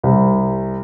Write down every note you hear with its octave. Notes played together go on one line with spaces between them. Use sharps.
C2